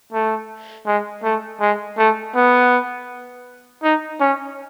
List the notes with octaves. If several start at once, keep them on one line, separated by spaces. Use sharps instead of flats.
A3
G#3
A3
G#3
A3
B3
D#4
C#4